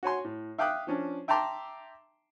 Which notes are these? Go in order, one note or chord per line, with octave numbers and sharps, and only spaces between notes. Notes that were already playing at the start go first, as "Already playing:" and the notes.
F#4 C#5 G#5 C6
A2
E5 F5 G5 D6 D#6 F#6
F3 C#4 D4
E5 G5 A5 A#5 C6 D6